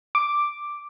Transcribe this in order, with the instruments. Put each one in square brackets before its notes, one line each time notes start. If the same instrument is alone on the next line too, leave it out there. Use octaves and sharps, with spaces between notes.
[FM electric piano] D6